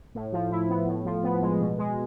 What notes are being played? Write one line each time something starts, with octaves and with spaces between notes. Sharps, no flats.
A2
F3
E4
B3
A2
F3
B3
G#3
B2
G#3